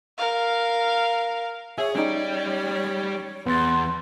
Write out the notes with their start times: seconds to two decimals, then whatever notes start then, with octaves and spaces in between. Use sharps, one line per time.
0.18 A#4 F5
1.78 G#4 C#5 E5
1.95 G3 C#4 D#4 C#5 D5
3.46 E2 B3 C6 A6